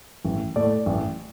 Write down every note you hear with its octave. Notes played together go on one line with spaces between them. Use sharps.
A1
A2 A3 D5
A1